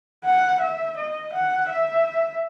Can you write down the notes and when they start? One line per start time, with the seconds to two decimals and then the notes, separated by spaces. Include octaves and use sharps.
0.25 F#5
0.60 E5
0.97 D#5
1.33 F#5
1.70 E5